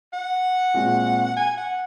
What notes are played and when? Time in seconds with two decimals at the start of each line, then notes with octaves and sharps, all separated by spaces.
0.13 F#5
0.74 A#2 G#3 C4 F#4
1.37 G#5
1.57 F#5